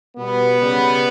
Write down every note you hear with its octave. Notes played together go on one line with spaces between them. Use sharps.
B2 G3 B3
C#3 G3